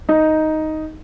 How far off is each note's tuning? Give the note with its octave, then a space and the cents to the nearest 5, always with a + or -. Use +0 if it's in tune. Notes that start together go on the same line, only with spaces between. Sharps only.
D#4 +5